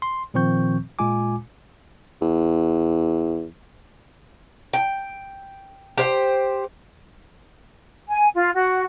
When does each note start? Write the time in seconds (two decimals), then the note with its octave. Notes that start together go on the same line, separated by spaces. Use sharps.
0.02 C6
0.34 A#2 D#3 F3 C4 C#6 G6
0.99 A#2 G#3 F4 G#5 D6
2.22 E2
4.73 G5
5.98 G4 C5 G5
8.09 G#5
8.35 F4
8.53 F#4